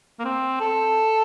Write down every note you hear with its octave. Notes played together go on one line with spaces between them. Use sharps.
A#3
C4
A4